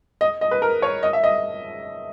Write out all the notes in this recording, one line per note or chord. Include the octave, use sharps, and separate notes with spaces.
D#5
D#5
B4
A#4
C#5
D#5
E5
D#5